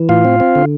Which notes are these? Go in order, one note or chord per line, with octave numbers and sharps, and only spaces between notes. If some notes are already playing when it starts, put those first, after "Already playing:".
Already playing: E3
A2 F4 F5
C4
C4
D3